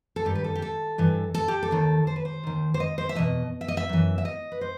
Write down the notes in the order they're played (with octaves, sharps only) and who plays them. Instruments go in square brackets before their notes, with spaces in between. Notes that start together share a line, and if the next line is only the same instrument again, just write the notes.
[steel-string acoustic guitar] A4
G2 D#3 G4
B4
A4
G4
A4
G2 E3
A4
G4
A4
D#2 D#3
C5
B4
C5
D#2 D#3
C5
D#5
C5
E5
E2 B2 D#5
E5
D#5
E5
F#2 E3
E5
D#5
B4
C5